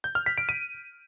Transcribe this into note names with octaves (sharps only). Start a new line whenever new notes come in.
G6
F6
B6
D7
D#7